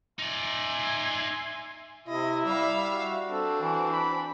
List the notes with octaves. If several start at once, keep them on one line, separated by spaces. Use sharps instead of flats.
D#4 D5 E5 G#5 C6
C3 E4 D#5
G3 E5 F5
F#4
C4 D4 A4
E3
B5